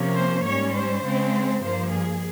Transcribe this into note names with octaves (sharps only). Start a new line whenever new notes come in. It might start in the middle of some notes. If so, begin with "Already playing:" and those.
Already playing: C3 F3 A#3 C#4
C5
G#2 G3 C#4 C#5
C5
C#3 G#3 C4
G2 F3 A#3 C5
G#4